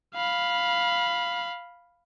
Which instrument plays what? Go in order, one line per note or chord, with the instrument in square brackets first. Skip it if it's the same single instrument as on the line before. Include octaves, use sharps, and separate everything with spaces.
[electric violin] F5 B5